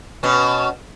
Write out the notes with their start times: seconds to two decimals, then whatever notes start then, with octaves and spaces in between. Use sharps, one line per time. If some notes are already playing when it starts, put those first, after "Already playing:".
0.23 B2 C#4